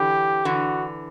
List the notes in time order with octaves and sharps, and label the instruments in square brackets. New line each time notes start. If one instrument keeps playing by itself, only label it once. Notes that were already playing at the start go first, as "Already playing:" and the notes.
Already playing: [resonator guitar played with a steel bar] D3 E3 [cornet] G4
[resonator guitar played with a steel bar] D3 E3 [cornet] F#4